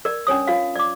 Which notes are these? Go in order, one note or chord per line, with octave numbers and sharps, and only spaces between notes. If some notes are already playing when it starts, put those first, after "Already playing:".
A#4 D5
C#4 D4 C#5 D#6
F4 F5
D5 D6